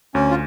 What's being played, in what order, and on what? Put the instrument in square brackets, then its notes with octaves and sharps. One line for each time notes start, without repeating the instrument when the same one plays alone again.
[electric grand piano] D2 [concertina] C#4
[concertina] F4